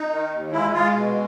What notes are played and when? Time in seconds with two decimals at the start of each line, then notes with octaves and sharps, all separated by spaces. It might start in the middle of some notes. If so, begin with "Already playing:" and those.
Already playing: D#4
0.11 D#3
0.32 D#2
0.52 G#3 E4
0.73 G#3 F4
0.94 B2